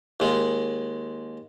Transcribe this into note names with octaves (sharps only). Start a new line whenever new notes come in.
D#2 G#3